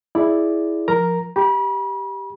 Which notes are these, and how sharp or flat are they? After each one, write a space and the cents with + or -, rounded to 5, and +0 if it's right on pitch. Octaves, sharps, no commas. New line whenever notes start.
E4 +0 G#4 +0 D5 +0
F3 +0 A#4 +0 A#5 +0
G4 +0 B5 -40